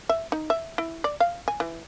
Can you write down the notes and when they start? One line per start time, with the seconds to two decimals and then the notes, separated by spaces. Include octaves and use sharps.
0.09 E5
0.32 D#4
0.50 E5
0.78 E4
1.04 D5
1.20 F5
1.48 G#5
1.60 E3